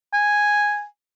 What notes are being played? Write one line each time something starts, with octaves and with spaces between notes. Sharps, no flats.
G#5